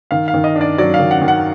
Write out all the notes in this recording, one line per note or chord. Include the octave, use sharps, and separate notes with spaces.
D#3 F5
F5
D#3
D#5
D4
D5
F#3 D5
F5
D#3
F#5
D#3
F#5